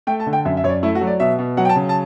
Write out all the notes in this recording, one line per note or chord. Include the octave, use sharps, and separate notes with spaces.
A3 G5
A5
D3
G5
F#2 E5
E5
F#2 C#5
D5
A3 E4
F#4
F#3
D5
B2 E5
B2
F#3 F#5
G5
A5
C#3
A5